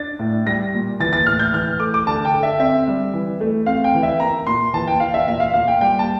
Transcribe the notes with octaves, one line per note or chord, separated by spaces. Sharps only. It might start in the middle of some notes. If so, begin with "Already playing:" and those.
Already playing: D4 A6
A2
G3 A#6
A#2
E3 A6
A6
A2 F6
G6
E3 F6
A3 D6
D6
D3 A5
G5
D3
E5
C4 E5
G3
E3
A3
C4 F5
G5
E3
E5
A#3 A#5
A#2 C6
E3 A5
G5
E3 F5
E5
A#2 E5
F5
A#2 F5
G5
G3 G5
A5